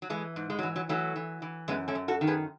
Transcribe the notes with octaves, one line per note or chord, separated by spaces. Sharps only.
F#3
E3 G#3
G#2
G#3
F#3
E3
F#3
E3 F#3 A3
E3
E3
F#2 G#3 B3
A3 C#4
F#2
F#4 A4
D#3
G#4 B4